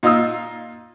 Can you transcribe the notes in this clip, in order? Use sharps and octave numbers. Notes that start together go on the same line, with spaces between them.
A#2 D#4 F4 D#6 E6